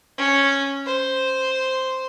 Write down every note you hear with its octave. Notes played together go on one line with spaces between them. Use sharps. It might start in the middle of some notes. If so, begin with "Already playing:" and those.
C#4
C5